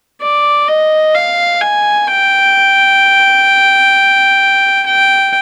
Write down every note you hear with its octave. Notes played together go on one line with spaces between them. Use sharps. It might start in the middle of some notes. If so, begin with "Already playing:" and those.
D5
D#5
F5
G#5
G5
G5